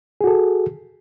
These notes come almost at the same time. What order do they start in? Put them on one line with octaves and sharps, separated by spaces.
G#4 F#4 A4